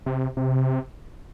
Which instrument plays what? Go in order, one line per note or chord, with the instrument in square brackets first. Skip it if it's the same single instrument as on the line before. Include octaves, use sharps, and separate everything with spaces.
[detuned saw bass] C3
C3